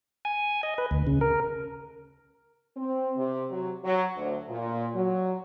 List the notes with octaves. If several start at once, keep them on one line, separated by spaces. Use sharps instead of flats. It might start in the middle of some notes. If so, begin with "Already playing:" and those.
G#5
D#5
B4
D2
C#3
A#4
C4
C3
F#3
F#3
D2
A#2
F#3